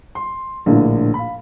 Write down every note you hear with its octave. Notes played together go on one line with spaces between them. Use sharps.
C6
A#1 A2 D3 A#3 D4 F4
F5 B5